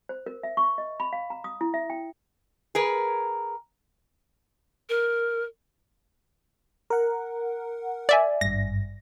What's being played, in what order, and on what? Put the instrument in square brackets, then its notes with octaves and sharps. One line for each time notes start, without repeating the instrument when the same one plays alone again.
[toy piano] C5
A#4
E5
C#6
D#5
B5
F5
A#5
D#6
E4
E5
G5
[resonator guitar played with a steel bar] G#4 A#4 B4
[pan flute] A#4
[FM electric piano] A#4 F#5
[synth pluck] D5 E5 G#5
[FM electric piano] G#1 G2 [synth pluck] A#6